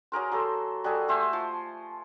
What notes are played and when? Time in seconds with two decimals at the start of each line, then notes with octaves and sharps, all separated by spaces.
0.12 F#3 G#4 A#4 C5
0.31 F#3 A4 C5
0.84 G3 F#4 G#4 A4
1.08 A3 C5 E5 G#5
1.33 F3